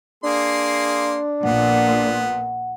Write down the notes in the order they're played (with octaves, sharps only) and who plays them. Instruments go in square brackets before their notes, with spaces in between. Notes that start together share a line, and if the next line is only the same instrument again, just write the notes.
[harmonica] A#3 G#4 C6 [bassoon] D4
[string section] A#1 A#2 [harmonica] B3 [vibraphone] F#5